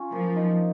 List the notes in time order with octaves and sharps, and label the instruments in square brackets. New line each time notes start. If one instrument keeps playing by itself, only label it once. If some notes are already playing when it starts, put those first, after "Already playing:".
Already playing: [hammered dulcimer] C#4 F4
[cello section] F3 [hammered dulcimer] A#3
[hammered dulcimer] D#4